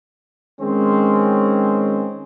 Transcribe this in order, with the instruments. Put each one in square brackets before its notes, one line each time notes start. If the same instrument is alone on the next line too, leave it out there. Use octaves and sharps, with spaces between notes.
[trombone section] D#3 G#3 C4 C#4